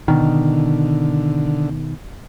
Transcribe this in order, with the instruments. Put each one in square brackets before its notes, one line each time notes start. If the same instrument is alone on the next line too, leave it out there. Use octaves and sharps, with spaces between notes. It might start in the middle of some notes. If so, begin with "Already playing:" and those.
[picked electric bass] B2 D#3 [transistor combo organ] D3